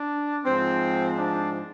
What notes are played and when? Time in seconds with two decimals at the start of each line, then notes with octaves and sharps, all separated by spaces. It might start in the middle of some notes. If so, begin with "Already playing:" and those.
Already playing: D4
0.44 G#2 F3 C4
1.17 D4